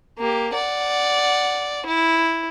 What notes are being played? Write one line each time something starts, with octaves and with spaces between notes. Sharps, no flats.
A#3 G4
D5 F#5
E4